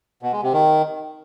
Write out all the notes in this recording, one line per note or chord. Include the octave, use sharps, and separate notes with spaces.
B2
G#3
C3
D#3